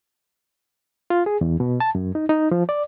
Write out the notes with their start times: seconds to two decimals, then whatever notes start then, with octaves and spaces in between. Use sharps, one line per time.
1.10 F4
1.26 G#4
1.41 E2
1.60 B2
1.80 A5
1.95 F#2
2.15 D#4
2.29 D#4
2.51 F3
2.69 D5